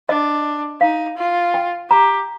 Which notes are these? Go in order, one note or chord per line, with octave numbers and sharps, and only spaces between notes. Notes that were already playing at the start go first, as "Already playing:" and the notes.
D4 D#5
D#4 F5
F4
G5
G4 A#5